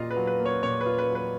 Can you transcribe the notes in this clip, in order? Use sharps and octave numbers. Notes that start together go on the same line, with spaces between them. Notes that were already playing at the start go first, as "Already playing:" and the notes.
Already playing: A#2 F4 D#5 F5
B4
F#3
B4
A#3
C#5
A#2 C#5
B4
F4
B4
F#3
B4